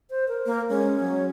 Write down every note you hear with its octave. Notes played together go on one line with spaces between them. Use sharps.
C5
A#4
A#3
G#3 C#4
F#3